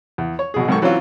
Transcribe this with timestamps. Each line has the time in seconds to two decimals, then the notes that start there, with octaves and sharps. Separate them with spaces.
0.18 E2
0.39 C#5
0.54 G#1 B2 G#4
0.68 B1 G#2 D#3 A4 C#6
0.82 E3 F#3 C4 C#4 F4